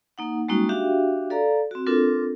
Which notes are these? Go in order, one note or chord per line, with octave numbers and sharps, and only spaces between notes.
A#3 D#4 F#5
G3 G#3 A#3 C#4 D#4 F#4
D4 F#4 G4 E5 F5 G5
A4 D5 F5 A#5
C4 F#4
C4 D4 F4 A4 A#4